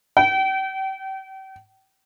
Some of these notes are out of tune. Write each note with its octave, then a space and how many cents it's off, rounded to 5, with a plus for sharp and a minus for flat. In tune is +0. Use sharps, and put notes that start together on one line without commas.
G5 -35